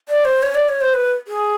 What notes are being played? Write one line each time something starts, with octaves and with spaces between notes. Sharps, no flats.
D5
C5
C#5
D5
C#5
C5
B4
G#4